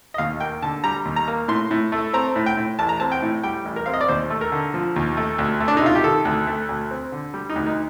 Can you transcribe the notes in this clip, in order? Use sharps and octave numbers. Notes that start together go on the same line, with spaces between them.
D#5
D#2 F5
A#3 G5
D3 A5
G3 A#5
D#2
A#5
A#3
A2 C6
A2
A3
C4 A#5
A2
G5
A2
A1 A5
A#5
C4 A5
G5
A2
G3 G5
A1
A#4
C4 F5
D#5
D5
D#2 C5
A3
A#4
D3
F3
D#2
A3
D2
A3
D4
D#4
C3 F4
G4
D#3 A4
D2
A3
D2
C4
D3
G3
D#4
D2
D#4